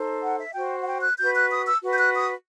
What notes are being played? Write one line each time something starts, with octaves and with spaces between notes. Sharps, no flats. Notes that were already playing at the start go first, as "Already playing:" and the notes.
Already playing: D#4 A4 C5
F#5
E5
F#4 C5 G5
F#5
G5
F#6
F#4 B4 G6
F#6
D#6
E6
F#4 B4
G6
F#6
D#6